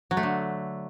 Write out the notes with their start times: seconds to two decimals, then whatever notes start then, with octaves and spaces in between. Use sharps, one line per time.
0.11 F#3
0.17 A3
0.23 D3